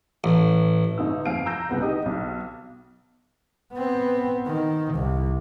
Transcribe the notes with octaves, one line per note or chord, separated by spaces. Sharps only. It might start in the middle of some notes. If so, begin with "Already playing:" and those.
A1
G1 D#4 E6
F2 F5 D7
A#5 E6 G6 A#6
G1 C2 B3 F#5
D#4 G4 D#5
B1
B3 C4
D#3
C2